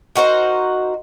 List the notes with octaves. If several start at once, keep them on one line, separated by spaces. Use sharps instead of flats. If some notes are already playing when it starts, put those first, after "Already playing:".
D#4 F#4 A#4 C5